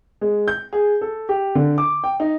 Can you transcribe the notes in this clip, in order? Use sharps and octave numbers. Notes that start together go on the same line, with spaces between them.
G#3
G6
G#4
A4
G4
D3
D6
G5
D#4